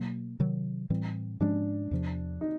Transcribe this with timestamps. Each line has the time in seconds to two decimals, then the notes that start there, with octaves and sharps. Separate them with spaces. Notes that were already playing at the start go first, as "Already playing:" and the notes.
Already playing: B2 F#3 A#3
0.40 C3 D#3 F#3
0.90 A2 E3 G3 C4
1.40 G#2 F3 G#3 C#4 D4
1.91 E2 C3 F3
2.41 D#4